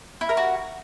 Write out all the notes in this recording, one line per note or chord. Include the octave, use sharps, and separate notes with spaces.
E4
A#4
F#4